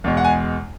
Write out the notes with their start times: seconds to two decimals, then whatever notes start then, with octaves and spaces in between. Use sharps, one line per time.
0.04 E2 B2 G#3
0.17 F#5
0.24 G#5